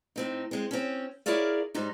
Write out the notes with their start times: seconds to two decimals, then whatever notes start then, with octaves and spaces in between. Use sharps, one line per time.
0.16 A2 C4 D#4
0.51 G#3 C4
0.71 C4 C#4
1.26 E4 G#4 A#4 C#5 D5 F5
1.74 G#2 G3 D#4